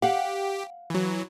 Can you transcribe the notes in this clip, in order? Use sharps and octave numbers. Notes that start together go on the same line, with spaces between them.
G4 F5 F#5
E3 F#3